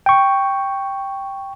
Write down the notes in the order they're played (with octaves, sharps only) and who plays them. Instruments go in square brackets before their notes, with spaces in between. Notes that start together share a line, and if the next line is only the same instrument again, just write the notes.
[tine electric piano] G5 C#6